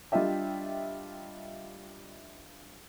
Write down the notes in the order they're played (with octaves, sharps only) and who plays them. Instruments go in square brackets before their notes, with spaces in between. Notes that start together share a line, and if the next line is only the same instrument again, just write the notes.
[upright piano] G3 D4 F4 D#5 E5 G5